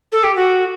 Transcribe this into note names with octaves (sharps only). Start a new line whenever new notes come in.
A4
G4
F#4